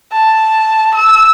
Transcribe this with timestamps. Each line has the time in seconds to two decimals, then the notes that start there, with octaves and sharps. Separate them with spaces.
0.12 A5
0.94 E6